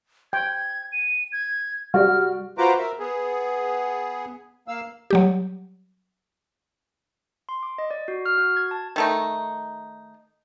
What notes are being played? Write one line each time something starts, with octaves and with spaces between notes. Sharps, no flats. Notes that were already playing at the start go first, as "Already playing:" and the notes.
G5 G#6
D#7
G#6
G3 F#4 D5 F6
F4 F#4 B4 C5 A#5 D6
A#4 E5
B3 G#4
A#3 F5 E6
F#3 G3 G4
C6
D6
D#5
D5
F#4
F6
F#4
G#6
A5
D#3 A3 D#4